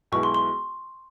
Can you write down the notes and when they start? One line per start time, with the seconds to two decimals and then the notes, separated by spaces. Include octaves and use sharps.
0.12 B1 B2 G#3 B3 E4 C#6
0.23 C6
0.34 C6